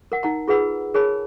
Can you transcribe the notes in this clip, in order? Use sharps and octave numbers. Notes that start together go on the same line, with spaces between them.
A#4 F#5
D#4 F#5 A#5
F4 G#4 B4 F#5 B5 E6
G#4 A#4 C#5 G#5 A5 B5